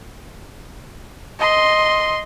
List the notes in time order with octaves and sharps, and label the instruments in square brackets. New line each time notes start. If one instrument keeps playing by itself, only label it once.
[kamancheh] D#5 C6